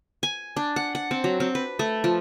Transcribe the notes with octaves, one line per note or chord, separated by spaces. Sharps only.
G#5
D4
F#5
F#5
C4
F#3
C4
B4
A3
F3